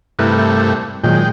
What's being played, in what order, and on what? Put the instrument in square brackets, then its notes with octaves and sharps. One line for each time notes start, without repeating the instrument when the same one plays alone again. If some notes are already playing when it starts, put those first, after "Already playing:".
[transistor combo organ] G2 C3 A3 [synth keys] E4 A#4 B4
[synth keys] A#2 D#3 F#3 [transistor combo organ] G#3 G5